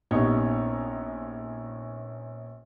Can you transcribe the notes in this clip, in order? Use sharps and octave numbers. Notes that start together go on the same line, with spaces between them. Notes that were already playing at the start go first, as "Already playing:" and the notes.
A#1 C3 B3 C#4 D#4 C#5